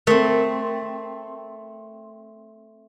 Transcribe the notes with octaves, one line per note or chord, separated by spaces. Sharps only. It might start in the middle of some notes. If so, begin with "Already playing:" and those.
A3 C4 A#4